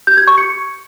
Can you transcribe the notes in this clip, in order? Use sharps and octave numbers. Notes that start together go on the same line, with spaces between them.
G6
G#6
C#6
C#7